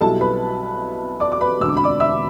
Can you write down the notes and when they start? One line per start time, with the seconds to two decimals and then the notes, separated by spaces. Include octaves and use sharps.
0.01 B1 B2 G3 E4 A4 A5
0.21 B4 B5
1.20 D5 D6
1.32 D6
1.41 B4 B5
1.60 E1 D2 D3 E6
1.69 D6
1.77 B5
1.84 D5 D6
2.00 E5 E6